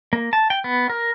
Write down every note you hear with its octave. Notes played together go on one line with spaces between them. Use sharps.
A#3
A5
G5
B3
A#4